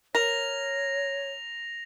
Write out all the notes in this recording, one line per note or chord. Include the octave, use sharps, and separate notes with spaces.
A#4 C#5 A#6 F7